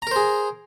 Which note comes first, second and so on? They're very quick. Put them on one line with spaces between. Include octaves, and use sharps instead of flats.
A#5 A#4 C5 G#4